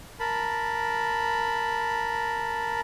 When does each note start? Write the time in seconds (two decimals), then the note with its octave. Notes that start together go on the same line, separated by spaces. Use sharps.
0.20 A#4 A5 B5